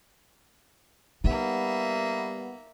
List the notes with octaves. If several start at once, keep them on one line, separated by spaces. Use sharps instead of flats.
G3 A#3 B3 D#4 E5